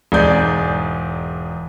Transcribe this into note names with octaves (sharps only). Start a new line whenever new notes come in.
E1 G#2 G#4 D5 G#5 G6